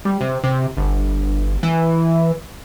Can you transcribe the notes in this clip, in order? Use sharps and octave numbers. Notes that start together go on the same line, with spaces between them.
G3
C3
C3
G1
E3